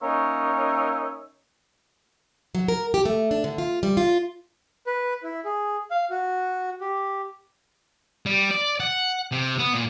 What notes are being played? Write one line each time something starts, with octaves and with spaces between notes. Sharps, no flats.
A#3 C#4 D#4 A#4 C#5 E5
F#3
A#4
G4
A3
D4
D3
F4
G3
F4
B4
E4
G#4
F5
F#4
G4
G3
D5
F#5
C3
B3
A#2